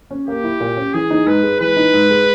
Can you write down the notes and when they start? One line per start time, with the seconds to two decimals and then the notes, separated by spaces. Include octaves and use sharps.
0.11 C#4
0.27 A#3 G4
0.44 E4
0.60 A#2
0.77 C#4
0.93 E3 G#4
1.10 D#4
1.26 G#2 B4
1.43 G#3
1.60 E3 B4
1.77 D#4
1.93 G#2
2.10 G#3